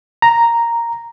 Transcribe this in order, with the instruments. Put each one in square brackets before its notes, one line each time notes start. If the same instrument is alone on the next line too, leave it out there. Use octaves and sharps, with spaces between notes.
[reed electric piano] A#5